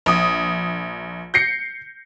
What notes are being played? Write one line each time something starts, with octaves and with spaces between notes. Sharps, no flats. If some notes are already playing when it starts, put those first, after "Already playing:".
A#1 D#6
G6 A#6 C7 C#7